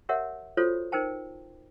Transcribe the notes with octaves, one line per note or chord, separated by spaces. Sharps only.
G4 A#4 C#5 E5 F#5
F4 F#4 A4 C5 C#5
D#4 A#4 C5 G5 A5